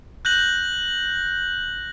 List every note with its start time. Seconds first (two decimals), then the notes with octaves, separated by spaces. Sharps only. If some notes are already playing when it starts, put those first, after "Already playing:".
0.25 F#6 G6 A#6 F#7